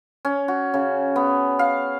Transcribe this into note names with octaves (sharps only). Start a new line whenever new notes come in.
C#4
F#4
C#3
B3
F5